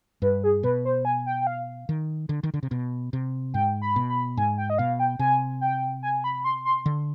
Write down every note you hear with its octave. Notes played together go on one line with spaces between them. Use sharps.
G2 B4
G#4
B2 B4
C5
G#5
G5
G5
F5
D#3
D3
D#3
D3
C3
B2
C3
G#2 G5
B5
B2
B5
G#2 G#5
G5
D#5
B2 F5
G5
C3 G#5
G5
G#5
B5
C6
C6
D3